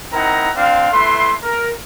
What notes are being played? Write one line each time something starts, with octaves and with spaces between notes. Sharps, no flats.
C4 D#4 E4 A#4 F#5 A#5
C4 D4 F4 F5
A3 E4 B4 C6
A#4